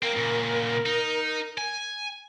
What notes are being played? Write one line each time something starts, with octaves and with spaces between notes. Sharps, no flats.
A#3 C4 A#4
A#2 C#3
D#4
G#5